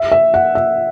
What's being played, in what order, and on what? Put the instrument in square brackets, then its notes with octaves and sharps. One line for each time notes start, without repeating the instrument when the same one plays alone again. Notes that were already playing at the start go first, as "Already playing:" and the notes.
Already playing: [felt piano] E5
E5
F#5
E5